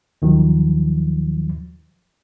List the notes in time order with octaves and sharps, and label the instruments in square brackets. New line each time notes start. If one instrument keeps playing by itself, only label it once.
[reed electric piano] D#2 D#3 F3 F#3